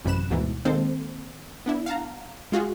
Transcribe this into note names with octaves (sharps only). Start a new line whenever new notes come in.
A1 F#2 C3 B5 F#6 E7
D2 G#2 B2 E3
D#3 G#3 A#3 C4 A4 C5
B3 D4 E4
F5 F#5 A5 A#5
G#3 F4 F#4 G#4